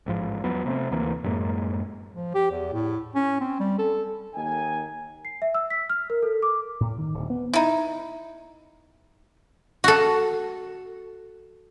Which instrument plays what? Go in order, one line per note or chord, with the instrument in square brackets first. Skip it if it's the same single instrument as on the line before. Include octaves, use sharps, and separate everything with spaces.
[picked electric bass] A1 G#2 F3
E2 F#3 B3
C3 A3 C4
D2 E3 A#3
F#2 A2 G#3 A#3
[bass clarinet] F3
G4
E2
A2
C#4
C4
G3
A4
[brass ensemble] D#2 D#3 G#5
[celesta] C7
E5
E6
B6
F6
A#4
A4
D6
[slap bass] A2
D#3
D1
B3
[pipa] D#4 E4
[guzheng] F#4 A4